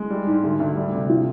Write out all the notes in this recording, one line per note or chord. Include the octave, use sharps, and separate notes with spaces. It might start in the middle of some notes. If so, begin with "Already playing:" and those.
Already playing: G#3
G3
G#2
D2
D2
G3
C3
F3